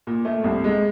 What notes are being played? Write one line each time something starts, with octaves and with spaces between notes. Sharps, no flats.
A#2
A3
C2
G#3